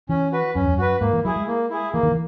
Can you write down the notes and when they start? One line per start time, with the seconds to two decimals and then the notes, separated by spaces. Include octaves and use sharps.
0.09 E3 C#4
0.32 F#4 B4
0.55 F#2 C#4
0.64 E2
0.73 F#2
0.78 F#4 B4
1.01 G#2 A#3
1.13 E3
1.24 F#3 E4 G#4
1.36 G#3
1.47 A#3
1.70 E4 G#4
1.93 E3 A#3
2.03 D#3
2.12 E3